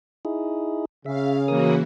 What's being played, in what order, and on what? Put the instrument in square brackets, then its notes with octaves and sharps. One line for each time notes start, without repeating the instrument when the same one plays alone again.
[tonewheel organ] D#4 E4 G#4
[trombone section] C#3 [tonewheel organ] E5 [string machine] F5
[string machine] E3 A#3 F#4 [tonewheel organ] A#4 D#6